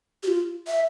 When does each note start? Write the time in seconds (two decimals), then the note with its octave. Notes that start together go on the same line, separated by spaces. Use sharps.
0.23 G4
0.28 F4
0.68 E5